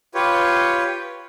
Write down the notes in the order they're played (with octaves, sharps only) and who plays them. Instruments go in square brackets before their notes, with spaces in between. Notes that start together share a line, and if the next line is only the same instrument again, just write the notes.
[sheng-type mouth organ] F4 G4 B4 C#5